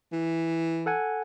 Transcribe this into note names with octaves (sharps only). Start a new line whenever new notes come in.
E3
A4 F#5 G#5